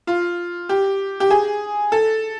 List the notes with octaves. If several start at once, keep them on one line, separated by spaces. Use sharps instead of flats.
F4
G4
G4
G#4
A4